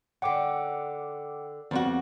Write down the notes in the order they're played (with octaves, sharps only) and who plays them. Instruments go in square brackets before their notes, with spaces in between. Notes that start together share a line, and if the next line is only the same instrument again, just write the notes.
[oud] D3 C#4 [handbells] F#5 G5 D6
[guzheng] F2 G3 F#4 [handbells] B3